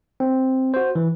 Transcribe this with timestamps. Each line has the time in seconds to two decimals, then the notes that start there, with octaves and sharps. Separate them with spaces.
0.20 C4
0.74 F#4 C5
0.95 E3